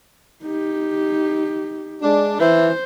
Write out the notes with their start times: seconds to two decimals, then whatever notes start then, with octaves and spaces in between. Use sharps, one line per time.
0.43 D#4 G4
2.02 G#3 D4
2.39 E3 C5